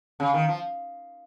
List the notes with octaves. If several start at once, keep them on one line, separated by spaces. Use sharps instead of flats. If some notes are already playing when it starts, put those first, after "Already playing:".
C#3
D#3
F3